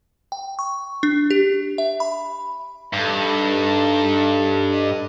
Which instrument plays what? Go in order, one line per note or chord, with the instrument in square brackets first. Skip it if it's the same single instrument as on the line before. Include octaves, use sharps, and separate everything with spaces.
[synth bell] G5
C#6
D4
G4
E5
B5
[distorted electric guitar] G2 [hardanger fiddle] D#4 A4
[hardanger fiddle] D#5